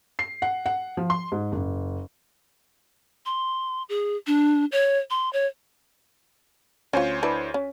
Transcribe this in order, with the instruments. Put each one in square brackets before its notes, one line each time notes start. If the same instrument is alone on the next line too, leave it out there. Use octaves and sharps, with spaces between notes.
[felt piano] C7
F#5
F#5
F3
C6
G#2
F#1
[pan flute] C6
G#4
D4
C#5
C6
C#5
[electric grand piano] D2 C5 C#5 [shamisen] C#4 F4
[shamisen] D4 E4 B4
C#4